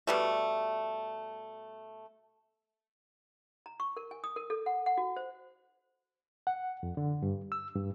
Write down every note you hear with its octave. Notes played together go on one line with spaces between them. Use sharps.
B2 G3 A3
A#5
C#6
A#4
G#5
D#6
A#4
A4
F#5
F#5
F#4
C5
F#5
F2
D3
G2
E6
G2